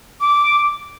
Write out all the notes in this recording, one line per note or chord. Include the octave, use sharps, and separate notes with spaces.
D6